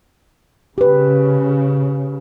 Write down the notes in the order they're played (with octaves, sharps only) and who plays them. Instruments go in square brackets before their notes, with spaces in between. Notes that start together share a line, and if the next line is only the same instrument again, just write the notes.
[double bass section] C#3 [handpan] G4 B4